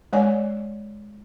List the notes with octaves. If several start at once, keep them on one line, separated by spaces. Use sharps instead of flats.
G#3 C#5 D5 G#5